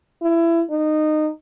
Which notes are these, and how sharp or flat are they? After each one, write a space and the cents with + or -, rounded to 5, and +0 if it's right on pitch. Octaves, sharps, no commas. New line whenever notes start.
E4 +25
D#4 -20